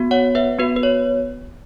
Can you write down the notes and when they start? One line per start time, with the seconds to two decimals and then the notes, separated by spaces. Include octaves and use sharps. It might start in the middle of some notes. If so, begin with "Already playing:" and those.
Already playing: B3 F#4
0.11 C#5 F#5
0.35 B4 E5
0.59 B3 F#4 B4
0.76 B4
0.83 C#5